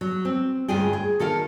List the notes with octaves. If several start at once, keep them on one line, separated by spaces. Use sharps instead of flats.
F#3
C4
D2 G2 C#4 F4 G#4 G5
G#4
D#3 A4 A#4 F5